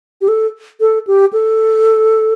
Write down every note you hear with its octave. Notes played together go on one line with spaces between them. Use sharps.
G4
A4
A4
G4
A4